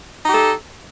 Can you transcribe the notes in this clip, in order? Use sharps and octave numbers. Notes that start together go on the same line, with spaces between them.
D#4 G4 A4